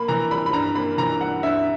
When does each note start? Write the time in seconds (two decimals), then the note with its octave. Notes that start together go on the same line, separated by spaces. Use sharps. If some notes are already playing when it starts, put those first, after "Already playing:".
Already playing: A#3 B5
0.08 E3 A#5
0.30 G3 B5
0.46 B5
0.53 G2 A#5
0.75 A#3 B5
0.98 E3 A#5
1.21 G3 F#5
1.43 G2 E5